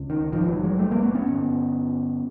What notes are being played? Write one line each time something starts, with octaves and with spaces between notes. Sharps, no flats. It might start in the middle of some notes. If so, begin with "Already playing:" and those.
Already playing: C#2 C#3
D#3
A#1 G#2 D#3 F3
E3 F#3
F#3 G#3
G3 A3
G#3 A#3
A3 B3
B3 C#4
A1 G2 D3